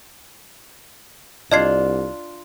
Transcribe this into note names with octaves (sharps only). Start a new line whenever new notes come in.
C2 D4 F4 D#5 G#6 C7